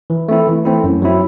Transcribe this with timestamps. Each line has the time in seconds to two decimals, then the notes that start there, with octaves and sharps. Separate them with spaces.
0.10 E3
0.28 A3 C4 E4
0.47 E3
0.65 A3 C4 E4
0.84 F#2
1.02 F#3 C4 E4